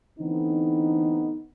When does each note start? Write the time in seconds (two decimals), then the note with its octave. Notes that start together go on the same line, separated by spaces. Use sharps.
0.19 D3 E3 A3 B3 C4 D#4